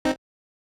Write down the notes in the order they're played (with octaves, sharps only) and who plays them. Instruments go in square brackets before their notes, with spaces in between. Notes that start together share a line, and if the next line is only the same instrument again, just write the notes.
[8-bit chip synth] C4 D#4